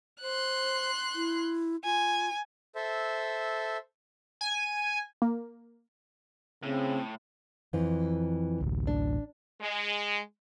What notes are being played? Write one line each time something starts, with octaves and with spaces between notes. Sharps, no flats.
C5 C6 F#6
E4
F4 G#5
A4 C5 E5
G#5
A#3
A2 C#3 C4
F2 E3
A1 D2
D4
G#3